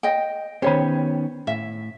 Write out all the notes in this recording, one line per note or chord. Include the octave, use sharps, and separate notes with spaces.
D#5 G5
D#3 B3 C#4 G4 C5 C#5 B5
A2 E5